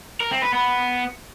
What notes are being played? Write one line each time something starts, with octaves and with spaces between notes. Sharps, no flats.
A#4
C4
B4
B3